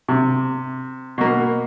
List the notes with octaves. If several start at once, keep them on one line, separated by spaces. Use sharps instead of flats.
C3
B2 A#3